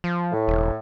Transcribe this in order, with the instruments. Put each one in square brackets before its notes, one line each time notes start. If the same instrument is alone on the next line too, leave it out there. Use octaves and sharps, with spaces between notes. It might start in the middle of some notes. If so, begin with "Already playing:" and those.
[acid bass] F3
[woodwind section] A2
[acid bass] E1